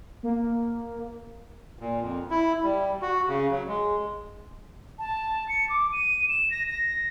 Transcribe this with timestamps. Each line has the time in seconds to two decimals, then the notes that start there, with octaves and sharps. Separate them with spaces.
0.23 A#3
1.79 A#2
2.00 F2
2.31 E4
2.63 G3
3.02 F#4
3.28 C#3
3.51 F#3
3.68 G#3
4.99 A5
5.49 C#7
5.70 D6
5.93 D#7
6.29 E7
6.51 A#6
6.70 A#6